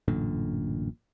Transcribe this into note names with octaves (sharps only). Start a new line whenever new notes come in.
A1 F#2 A#2 D3